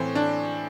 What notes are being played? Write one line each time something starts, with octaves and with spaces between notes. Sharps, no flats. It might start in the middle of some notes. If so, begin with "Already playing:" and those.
Already playing: A2 E3 C4
D4